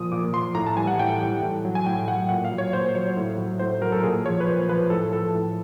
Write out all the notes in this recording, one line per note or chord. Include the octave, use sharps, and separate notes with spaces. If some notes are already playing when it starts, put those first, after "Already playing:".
Already playing: A#2 F3 D#6
A#2 D6
F3 C6
A2 A#5
A5
E3 G3 G#5
F#5
A2 G5
E3 G3
A2
F#3
G#5
A2 G5
F#3 F#5
A#2 F#5
F5
F#3
C#5
A#2 C5
F#3 C#5
A2
F#3
A2 C5
F#3 A#4
A4
A#2 G#4
F3 C#5
B4
A#2 C5
F3 B4
A2 A4
F3 A4
A2